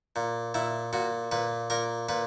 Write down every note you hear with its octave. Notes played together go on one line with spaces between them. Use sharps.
A#2
A#2 E4
A#2 F#4
A#2 B4
A#2 A#4
A#2 B4